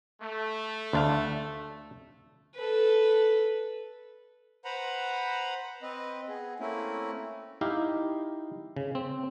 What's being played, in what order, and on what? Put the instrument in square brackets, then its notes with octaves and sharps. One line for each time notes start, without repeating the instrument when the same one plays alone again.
[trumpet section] A3
[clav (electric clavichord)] D2 D4 F5
[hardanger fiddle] A4 B4
[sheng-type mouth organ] B4 C5 F#5 A#5 B5
C4 B4 D#5
B3 G#4
A3 A#3 C4 C#4 E4
[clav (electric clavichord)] D#4 E4 G4 D#5 F5
C#3
C4